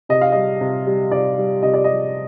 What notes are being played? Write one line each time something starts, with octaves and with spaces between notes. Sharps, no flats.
C3 D#5
F5
G3 D#5
C3
G3
C3 D5
G3
C3 D#5
D5
G3 D#5